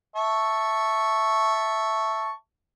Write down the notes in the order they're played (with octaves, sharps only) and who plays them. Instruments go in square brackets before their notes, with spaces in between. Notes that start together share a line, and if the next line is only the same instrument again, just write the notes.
[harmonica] E5 A5 C#6